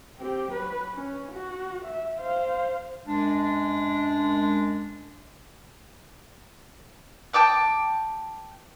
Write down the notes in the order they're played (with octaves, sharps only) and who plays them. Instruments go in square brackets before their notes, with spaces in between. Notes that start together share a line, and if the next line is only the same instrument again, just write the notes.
[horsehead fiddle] C4 G4
F#3 B4
C#4
F#4
E5
C5 F5
[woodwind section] F#2 G#3 D4
[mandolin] G5 A5 D6 D#6